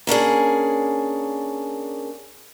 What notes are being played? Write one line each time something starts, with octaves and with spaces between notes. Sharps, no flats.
A#3 C#4 D4 G#4